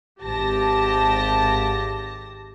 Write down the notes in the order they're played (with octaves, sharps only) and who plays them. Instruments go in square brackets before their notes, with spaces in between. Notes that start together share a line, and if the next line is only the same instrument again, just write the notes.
[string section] G#1 G4 A5 A#6